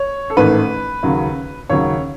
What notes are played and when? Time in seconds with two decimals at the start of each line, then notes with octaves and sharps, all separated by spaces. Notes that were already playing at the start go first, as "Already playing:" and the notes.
Already playing: C#5
0.30 A4
0.37 A1 G#2 D#3 A3 B4
1.03 D#2 C#3 F#3
1.69 D#2 C#3 F#3 C#5